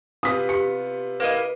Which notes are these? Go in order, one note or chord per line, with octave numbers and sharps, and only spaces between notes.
C3 B3 F4 D#6 B6
G4 C#7
A#3 E4 B4 D#5